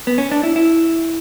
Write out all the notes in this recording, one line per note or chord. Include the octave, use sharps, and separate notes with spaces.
B3
C#4
D4
E4
E4